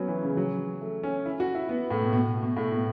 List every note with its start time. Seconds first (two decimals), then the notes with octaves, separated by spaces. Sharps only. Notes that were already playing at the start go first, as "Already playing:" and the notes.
Already playing: F#3 B3 C#4
0.08 E3
0.23 C#3
0.37 F#3
0.81 A3
1.03 C#4
1.26 E4
1.40 F#4
1.55 E4
1.69 B3
1.91 A2
2.02 B2
2.13 B2
2.43 B2
2.57 A2
2.72 B2